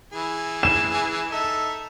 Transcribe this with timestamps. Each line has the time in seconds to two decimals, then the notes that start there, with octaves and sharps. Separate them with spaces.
0.13 E3 G#4
0.63 E7
1.32 D#4 A4 E5